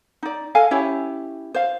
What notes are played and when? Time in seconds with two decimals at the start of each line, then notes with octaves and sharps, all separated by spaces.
0.23 D#4 D5
0.55 A4 D#5 F5 G#5
0.71 C#4 E4 G4 C#5
1.54 C5 F5